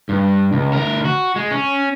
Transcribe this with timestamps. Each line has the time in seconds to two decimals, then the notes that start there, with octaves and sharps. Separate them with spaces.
0.09 G2
0.52 C#2
0.73 D2 A#4
1.05 F#4
1.36 G#3
1.51 C#4